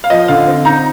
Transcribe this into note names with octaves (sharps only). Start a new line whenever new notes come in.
F5
F3 D#5
D3 F5
C4
D#4 A#5